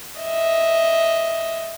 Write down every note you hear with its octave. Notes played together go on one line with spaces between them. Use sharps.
D#5 E5